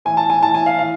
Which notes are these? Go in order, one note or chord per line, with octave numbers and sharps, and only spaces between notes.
A2 E3 G#5
A5
G#5
A2 E3 A5
G#5
F5
A2 E3 F5